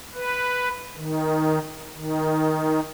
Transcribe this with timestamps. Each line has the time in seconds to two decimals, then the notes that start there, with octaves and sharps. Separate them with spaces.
0.15 B4
0.96 D#3
1.96 D#3